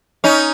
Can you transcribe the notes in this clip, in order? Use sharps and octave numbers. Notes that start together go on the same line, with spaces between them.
C#4 D#4